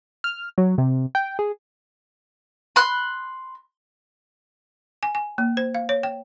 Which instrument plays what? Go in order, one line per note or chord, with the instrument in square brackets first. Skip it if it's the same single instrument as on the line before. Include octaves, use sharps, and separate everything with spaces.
[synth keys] F6
F#3
C3
G5
G#4
[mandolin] B5 C6 F#6
[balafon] G#5
G#5
A#3
C5
F5
C#5
G5